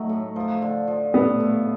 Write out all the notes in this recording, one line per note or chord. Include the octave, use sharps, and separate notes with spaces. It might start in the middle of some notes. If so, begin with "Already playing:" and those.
Already playing: F#3 A3 D#4
A2
F3
D3
F3
A2 B3
A2